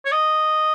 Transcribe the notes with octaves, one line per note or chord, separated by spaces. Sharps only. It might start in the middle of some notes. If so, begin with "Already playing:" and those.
C#5
D#5